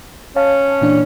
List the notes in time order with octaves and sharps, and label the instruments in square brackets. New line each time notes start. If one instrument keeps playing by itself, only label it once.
[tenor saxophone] C#4 [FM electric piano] C#5 F5 A5
[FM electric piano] A#2 E3 D4